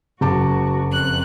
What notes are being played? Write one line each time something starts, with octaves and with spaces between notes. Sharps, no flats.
F#1 F#4 A5 D6
F2 F#6